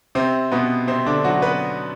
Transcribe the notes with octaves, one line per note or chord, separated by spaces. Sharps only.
C3 C4
B2 B3
C3 C4
D3 D4
F#3 F#4
B3 B4